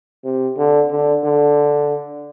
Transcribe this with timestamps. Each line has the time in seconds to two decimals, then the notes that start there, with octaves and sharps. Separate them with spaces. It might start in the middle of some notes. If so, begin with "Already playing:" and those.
0.24 C3
0.57 D3
0.91 D3
1.24 D3